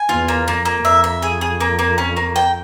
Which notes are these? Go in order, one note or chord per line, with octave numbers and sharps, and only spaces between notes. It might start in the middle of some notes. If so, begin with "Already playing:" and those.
Already playing: G#5
E2 F4
A#3
F2 A#3
A#3
F2 E5
E5
G#4
G#4
A#3
A#3
C#4
A#3
G5